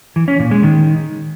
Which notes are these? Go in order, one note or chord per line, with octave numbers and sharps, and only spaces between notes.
E3
C#4
A#2
G#3
D#3